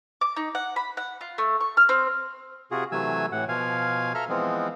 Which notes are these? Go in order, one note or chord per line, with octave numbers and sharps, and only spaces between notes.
D6
D#4
F#5
B5
F#5
F4
A3
C#6
F6
C4
C3 F4 F#4 G#4
C3 E3 F#3 A3 G#5 E6
A2 E3 F#5
B2 F3 F5 G#5
A4 E5 A#5 F6
E3 F3 G#3 B3 C4